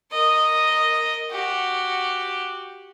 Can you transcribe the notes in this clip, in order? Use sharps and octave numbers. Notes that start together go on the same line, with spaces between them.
A#4 D#5
F#4 G4